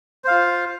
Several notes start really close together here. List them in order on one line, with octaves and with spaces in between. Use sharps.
C5 F5 F4